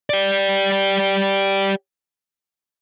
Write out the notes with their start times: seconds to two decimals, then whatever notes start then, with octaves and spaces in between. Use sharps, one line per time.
0.10 G4 D5